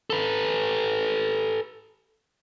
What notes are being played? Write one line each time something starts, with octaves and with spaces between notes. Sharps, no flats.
A4 B4